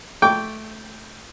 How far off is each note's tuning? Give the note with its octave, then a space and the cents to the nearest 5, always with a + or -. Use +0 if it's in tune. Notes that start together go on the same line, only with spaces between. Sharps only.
A3 -15 G5 -5 D6 -30